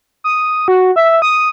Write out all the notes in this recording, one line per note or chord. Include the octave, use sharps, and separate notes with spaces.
D#6
F#4
E5
D#6